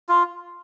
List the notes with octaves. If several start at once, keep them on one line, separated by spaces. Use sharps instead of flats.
F4